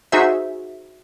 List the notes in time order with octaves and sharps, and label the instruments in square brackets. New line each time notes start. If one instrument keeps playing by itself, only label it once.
[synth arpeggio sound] D#4 F#4 G#4 C5 E5